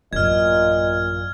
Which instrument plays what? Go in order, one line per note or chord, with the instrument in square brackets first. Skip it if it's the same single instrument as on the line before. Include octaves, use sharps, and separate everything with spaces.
[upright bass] A1 F#2 [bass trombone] A#2 [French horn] D#5 [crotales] F6 G#6